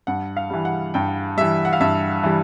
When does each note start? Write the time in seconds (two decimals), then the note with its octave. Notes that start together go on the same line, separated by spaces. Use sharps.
0.07 G2 F#5
0.37 F5
0.50 E3 G3
0.65 F#5
0.94 G2 G5
1.37 E3 G3 E5
1.65 F#5
1.73 F5
1.80 G2 E5
2.23 E3 G3